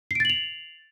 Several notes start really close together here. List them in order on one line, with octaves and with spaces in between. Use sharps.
C7 D7 A6 F#7 F7